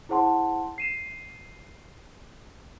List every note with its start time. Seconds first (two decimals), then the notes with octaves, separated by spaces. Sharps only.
0.09 E4 G#4 C5 F#5 A5 C6
0.78 C7 D#7 E7